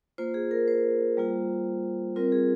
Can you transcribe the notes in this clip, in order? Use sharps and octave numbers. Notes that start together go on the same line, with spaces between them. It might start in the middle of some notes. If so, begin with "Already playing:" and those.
A#3 F4 C5
G#4
A#4
C5
G3 A#3 F4
G3 C4 F4 A#4
G#4